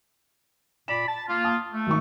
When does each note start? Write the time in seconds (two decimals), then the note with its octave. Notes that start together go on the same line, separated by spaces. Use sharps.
0.88 A#2 D5 B5 E7
1.07 A5
1.28 A#3 F4
1.45 A5 D#6
1.73 A3
1.87 G#1 D#3 C#6